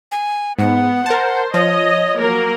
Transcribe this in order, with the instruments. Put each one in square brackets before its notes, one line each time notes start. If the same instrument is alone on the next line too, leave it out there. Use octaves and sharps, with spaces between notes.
[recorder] G#5
[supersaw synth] G#2 [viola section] B3 [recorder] F#5
[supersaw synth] A#4 A5 [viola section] C5
[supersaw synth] F3 [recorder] C#5 [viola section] D#5
[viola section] F#3 A#3 A#4